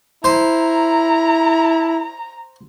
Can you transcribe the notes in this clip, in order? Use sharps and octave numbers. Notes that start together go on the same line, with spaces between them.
E4 C5 A#5